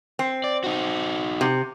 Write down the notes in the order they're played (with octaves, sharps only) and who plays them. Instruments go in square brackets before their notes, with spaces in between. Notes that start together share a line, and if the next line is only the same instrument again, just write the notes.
[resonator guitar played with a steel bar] C4
[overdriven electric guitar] D5
D#4 F#4
[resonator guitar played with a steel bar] C3